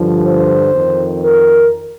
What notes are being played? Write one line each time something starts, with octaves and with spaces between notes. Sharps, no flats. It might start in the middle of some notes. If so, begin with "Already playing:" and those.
Already playing: G2 D3 F3
C5
F2 D#3
A#4